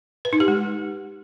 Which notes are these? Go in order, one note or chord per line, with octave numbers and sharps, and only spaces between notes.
B4
D#4
G4
G#3